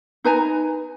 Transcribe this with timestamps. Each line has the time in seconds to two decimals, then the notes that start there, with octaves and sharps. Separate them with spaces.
0.24 D#4 B4 G#5 A#5